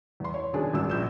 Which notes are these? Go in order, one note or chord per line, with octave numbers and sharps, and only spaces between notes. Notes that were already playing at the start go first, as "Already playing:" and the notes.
E2 C6
C#5
F#1 B2 D#3 F#3 D4 G#4
G#1 C#2 E6
A#1 G6 E7